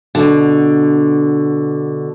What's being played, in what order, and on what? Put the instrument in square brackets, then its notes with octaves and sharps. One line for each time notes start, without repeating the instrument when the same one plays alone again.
[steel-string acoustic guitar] B2 D3